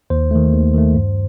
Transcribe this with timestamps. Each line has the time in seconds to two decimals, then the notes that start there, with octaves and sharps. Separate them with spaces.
0.10 D#2 C5
0.31 D#3 A3
0.53 D#2
0.74 D#3 A3
0.95 G2